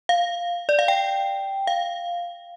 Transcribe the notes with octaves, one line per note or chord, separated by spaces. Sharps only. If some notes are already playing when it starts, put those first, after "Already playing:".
F5
D5
F5
G5
F5